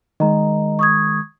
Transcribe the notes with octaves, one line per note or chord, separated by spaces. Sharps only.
D#3 G#3 D#5 A#5
C#6 D#6 G#6